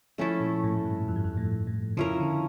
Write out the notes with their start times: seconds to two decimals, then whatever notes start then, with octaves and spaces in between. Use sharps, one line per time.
0.18 F3 A3 C#4 E4 A4
0.40 A#2
0.64 A2
0.78 A2
0.85 G2
1.08 F2
1.16 G2
1.24 F2
1.37 A2
1.67 A2
1.97 C#3 F3 C#4 E4 A#4
2.20 D3